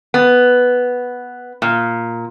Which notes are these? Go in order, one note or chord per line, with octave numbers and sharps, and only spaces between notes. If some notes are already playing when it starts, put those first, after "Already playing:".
B3
A#2